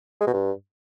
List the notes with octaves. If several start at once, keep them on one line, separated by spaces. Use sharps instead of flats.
G#3
B2
G2